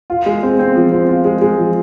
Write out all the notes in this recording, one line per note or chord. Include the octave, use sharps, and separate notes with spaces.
F4
G#3
C4
C4
F3
C4
F4
G#3
G#3
F3